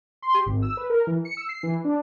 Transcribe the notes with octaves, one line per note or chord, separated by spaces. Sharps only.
C6
G4
G#1
E6
B4
A#4
E3
C#7
E6
C7
E3
D4